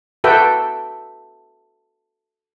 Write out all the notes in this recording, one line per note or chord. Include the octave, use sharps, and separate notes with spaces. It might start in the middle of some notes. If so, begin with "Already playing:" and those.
F#4 A4 B4 E5 G5